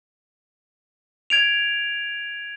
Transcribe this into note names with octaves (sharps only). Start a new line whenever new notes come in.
G#6 D7 F7